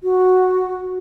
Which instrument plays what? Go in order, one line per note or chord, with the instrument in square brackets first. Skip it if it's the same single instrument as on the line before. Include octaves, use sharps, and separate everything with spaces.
[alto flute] F#4